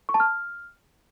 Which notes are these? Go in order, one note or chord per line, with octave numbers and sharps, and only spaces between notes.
C#6
A5
F6